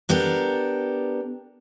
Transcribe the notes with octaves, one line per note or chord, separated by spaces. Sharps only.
B3 D4 G4 A4 A#4